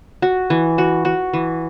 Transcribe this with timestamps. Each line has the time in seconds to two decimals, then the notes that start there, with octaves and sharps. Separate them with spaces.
0.22 F#4
0.50 E3
0.78 F#4
1.05 F#4
1.34 E3